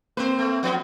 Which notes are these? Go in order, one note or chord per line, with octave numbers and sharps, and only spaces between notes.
A#3 C4 B4 C5
A3
F3 B3 C#4